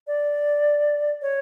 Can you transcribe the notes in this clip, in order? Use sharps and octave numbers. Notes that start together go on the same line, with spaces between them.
D5
C#5